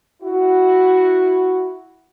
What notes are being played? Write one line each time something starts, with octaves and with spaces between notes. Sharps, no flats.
E4 F#4